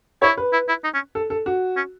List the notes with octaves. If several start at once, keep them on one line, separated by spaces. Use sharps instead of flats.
E4 C#5
B4
E4
E4
D#4
C#4
A4
A4
F#4
C#4